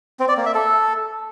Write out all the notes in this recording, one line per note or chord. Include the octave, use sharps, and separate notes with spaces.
C4
D5
A#3
E5
A4